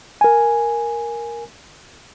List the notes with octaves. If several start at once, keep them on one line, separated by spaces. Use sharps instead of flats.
A#4 G#5